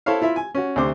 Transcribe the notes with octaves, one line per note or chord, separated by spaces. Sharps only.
E4 A4 C5 C#5 E5 F5
E4 F4 E5
G#5
C#4 F#4
D2 C3 C5 D6